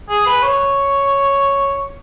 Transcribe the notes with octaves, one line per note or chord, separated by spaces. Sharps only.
G#4
B4
C#5